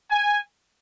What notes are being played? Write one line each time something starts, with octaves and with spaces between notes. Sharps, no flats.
G#5